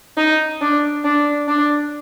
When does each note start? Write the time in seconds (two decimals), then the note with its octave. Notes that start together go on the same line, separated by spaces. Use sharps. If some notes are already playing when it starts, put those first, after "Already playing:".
0.18 D#4
0.62 D4
1.05 D4
1.48 D4